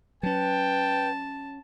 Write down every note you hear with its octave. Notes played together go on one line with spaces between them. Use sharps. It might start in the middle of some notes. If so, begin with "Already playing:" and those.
F#3 C#4 B4 G5 A5